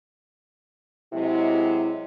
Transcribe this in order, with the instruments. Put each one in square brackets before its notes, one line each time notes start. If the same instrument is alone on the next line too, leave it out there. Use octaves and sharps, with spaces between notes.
[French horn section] C3 F#3 G#3 [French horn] E4